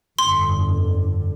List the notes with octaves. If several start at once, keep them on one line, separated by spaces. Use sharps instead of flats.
G1 F2 D3 C6